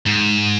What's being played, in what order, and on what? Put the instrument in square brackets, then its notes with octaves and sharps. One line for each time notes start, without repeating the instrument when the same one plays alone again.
[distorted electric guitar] G#2